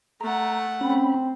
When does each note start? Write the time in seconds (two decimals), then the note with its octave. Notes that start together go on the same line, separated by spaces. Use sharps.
0.21 A3 F#5 A#5
0.81 C4 C#4 B5